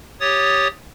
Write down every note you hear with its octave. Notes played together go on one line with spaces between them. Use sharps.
G4 C#5 D#6 A6